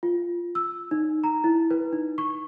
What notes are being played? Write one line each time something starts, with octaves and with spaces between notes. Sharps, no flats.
F4
E6
D#4
A#5
E4
B4
D#4
C#6